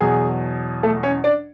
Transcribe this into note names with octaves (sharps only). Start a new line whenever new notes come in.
E2 B2 F#3 G#4 G#5
A3 A4
C#4 C#5
D4 D5